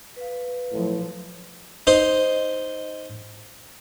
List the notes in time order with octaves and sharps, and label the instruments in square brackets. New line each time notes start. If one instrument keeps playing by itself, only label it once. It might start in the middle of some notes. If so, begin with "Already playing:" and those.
[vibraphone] B4 F5
[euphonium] A2 [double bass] F3 F#3
[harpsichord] D#4 C5